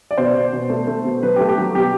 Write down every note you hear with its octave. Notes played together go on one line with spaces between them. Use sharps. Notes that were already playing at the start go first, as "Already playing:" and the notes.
D5
B2 C5
B2
B2
A3
A3
B2
F#3 B4
G4
A3
G4
F#3
B2 G4